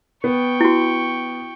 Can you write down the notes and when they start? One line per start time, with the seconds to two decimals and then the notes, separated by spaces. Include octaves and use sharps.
0.24 B3 G5 C#6
0.61 E4 F#4